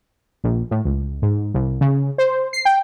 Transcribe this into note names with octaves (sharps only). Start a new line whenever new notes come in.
A#1
A2
C#2
G#2
C2
C#3
C5
C7
G5